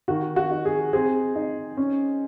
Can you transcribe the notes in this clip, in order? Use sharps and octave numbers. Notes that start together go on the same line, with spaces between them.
D#3 F#4
F#4
D#4
G#4
C4 G#4
D#4
C#4